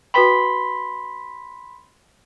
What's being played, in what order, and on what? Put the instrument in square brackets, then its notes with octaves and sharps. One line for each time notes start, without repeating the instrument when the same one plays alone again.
[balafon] F#4 B4 G5 [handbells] B5 C6 B6